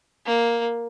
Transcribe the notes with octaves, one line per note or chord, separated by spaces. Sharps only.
A#3